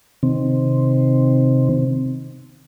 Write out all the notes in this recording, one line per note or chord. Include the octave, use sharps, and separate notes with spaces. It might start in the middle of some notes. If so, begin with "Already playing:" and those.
C3 D#3 C4